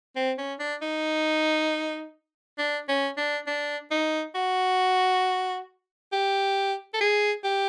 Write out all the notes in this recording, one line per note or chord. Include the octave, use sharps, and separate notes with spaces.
C4
C#4
D4
D#4
D4
C#4
D4
D4
D#4
F#4
G4
A4
G#4
G4